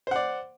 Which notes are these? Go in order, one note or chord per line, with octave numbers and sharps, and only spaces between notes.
C5 D5 F#5